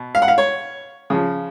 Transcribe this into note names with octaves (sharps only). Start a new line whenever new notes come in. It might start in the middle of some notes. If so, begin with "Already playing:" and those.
Already playing: B2
F5
F#5
F5
C#5
C#3 F3